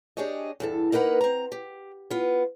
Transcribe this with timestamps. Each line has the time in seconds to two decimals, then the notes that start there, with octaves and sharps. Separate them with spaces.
0.17 D4 G4 G#4 C#5 D#5
0.60 E2 G2 A4
0.92 A#3 D#4 A#4 B4 F#5
1.21 C4 A#5
1.52 G4
2.10 B3 F4